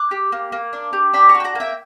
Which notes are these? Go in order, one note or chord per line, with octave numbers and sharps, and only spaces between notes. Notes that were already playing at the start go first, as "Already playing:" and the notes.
Already playing: D6 F#6
G4
A#3
A#3
D4
G4
D4 G5 B5
A#5 C#6
F#4
G5
F#5 A#5
A#3 E5 G5